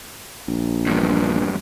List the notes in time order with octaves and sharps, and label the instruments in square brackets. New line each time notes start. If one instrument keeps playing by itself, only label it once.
[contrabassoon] A#1
[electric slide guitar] E2 G2